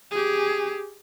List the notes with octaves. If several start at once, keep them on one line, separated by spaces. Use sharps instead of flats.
G4 G#4